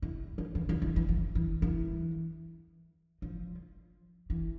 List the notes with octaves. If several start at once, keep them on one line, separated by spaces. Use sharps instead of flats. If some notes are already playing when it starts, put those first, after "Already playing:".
E3
F3
E3
F3
E3
E3
F3
E3
E3
F3
E3